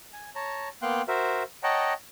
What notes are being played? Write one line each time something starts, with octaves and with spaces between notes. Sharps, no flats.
G#5
C#5 A5 A#5
A#3 B3 F5 G5 C6 F#6
F#4 A#4 C5 E5
C#5 D#5 F#5 G5 A5 A#5